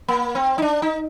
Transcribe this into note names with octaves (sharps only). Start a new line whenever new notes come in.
A#3
C4
D#4
D4
D#4